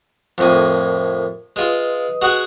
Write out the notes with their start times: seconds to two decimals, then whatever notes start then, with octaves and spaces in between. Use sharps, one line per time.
0.38 F2 A2 A#4 G#5
1.56 G#3 F4 B4 D#5 D#6
2.22 G#3 F#4 G#4